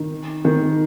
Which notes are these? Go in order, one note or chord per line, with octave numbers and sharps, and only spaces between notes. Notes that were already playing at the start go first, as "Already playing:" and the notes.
Already playing: D#3
D#3